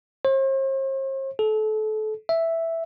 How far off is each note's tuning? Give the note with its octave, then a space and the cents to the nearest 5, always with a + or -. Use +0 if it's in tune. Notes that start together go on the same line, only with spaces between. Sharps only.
C5 +45
A4 -30
E5 +0